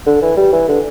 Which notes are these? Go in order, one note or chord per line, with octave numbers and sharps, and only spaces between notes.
D3
E3
G3
E3
D3